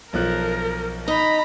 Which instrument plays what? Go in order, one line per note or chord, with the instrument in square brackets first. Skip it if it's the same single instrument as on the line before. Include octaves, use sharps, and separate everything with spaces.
[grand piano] B1 F3 F#6 [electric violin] A#4
[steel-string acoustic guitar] D#4 [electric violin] A#5 B5